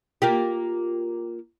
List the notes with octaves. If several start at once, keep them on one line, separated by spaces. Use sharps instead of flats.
A#3 F4 G4